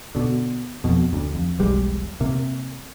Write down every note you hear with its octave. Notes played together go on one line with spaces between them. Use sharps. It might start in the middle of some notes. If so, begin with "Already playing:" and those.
B2 D3
F2 B2
D2
F2
E1 B1 G3 G#3
C3 A#3